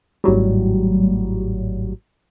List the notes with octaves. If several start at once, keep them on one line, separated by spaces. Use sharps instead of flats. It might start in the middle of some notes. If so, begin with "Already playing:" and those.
G#1 A2 F#3 G3